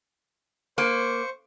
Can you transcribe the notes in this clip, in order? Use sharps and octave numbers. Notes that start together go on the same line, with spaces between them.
A#3 C5 C#6